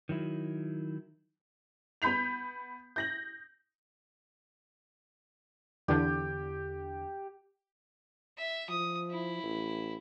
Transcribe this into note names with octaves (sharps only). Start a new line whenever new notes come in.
D#3 F#3 E4
B3 B5 G6 B6 F7
G6 A#6 F#7
E2 D3 G4
E5
F3 D#6
E4
A1